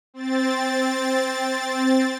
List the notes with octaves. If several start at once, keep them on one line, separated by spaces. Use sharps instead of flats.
C4 A6